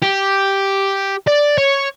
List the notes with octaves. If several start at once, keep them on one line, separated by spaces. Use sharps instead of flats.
G4
D5
C#5